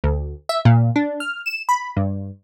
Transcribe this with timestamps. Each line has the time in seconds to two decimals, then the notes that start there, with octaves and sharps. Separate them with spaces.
0.04 D2
0.49 E5
0.65 A#2
0.96 D4
1.20 F6
1.46 E7
1.69 B5
1.97 G2